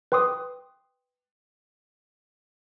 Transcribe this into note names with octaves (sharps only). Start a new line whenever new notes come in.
B4 G5 C6 D6 D#6